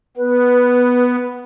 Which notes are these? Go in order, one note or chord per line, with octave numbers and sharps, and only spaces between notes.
B3 B4